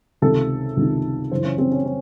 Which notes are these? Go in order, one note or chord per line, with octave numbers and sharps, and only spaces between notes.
C#2 C3 D#3 A4
C#2 C3 D#3
F#2 C#3 E3 C5
C#4
C4
C#4
C#4